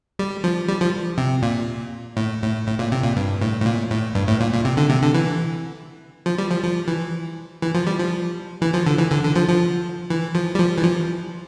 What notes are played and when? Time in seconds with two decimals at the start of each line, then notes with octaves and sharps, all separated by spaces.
0.19 G3
0.44 F3
0.68 G3
0.81 F3
1.18 C3
1.43 A#2
2.17 A2
2.42 A2
2.67 A2
2.79 A#2
2.92 C3
3.03 A#2
3.17 G2
3.41 A2
3.61 A2
3.66 A#2
3.91 A2
4.15 G2
4.28 A2
4.40 A#2
4.52 A#2
4.65 C3
4.77 D3
4.89 C3
5.02 D3
5.14 E3
6.26 F3
6.38 G3
6.51 F3
6.63 F3
6.88 E3
7.62 E3
7.75 F3
7.87 G3
7.99 F3
8.62 E3
8.74 F3
8.86 D3
8.98 E3
9.11 D3
9.23 D3
9.36 F3
9.48 F3
10.10 E3
10.35 F3
10.55 G3
10.60 F3
10.78 E3
10.84 F3